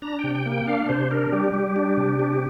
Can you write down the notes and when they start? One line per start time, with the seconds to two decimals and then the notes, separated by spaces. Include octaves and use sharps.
0.02 D4 A#5
0.19 G5
0.24 C3
0.35 G5
0.46 A#3
0.52 G5
0.67 D4 F5
0.89 C3 C5
1.11 D4 A#4
1.32 G3 G4
1.54 G3
1.76 D4
1.97 C3
2.19 D4